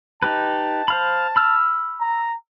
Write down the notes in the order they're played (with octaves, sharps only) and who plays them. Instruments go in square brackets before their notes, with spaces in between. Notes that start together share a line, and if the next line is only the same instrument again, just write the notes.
[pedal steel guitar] D#4 G4 B4 [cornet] A5
[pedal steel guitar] C5 F5 B5
B5 E6 F6
[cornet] A#5